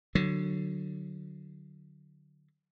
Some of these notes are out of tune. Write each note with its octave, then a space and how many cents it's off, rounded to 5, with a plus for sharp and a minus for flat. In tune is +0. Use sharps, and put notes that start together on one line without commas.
D3 +20 F#3 +0